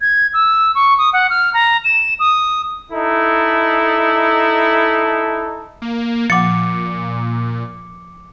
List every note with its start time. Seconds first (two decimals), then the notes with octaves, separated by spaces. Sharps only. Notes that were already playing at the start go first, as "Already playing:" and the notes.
0.01 G#6
0.34 E6
0.75 C#6
0.98 D#6
1.13 F#5
1.30 F6
1.54 A#5
1.84 E7
2.20 D#6
2.91 D#4 E4 A4
5.82 A#3
6.30 A#2 F3 F#5 D6 C#7